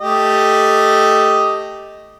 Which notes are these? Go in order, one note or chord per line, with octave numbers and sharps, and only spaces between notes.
A3 G4 D#5